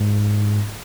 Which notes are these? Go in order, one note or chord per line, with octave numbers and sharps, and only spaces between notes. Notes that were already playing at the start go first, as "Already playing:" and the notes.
Already playing: G#2